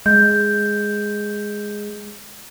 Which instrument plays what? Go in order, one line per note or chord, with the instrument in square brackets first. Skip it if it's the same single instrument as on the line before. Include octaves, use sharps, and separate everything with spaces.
[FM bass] G#3 [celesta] G6